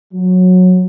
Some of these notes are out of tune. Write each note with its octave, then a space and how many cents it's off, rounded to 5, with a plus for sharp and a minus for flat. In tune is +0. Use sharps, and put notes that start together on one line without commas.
F#3 -15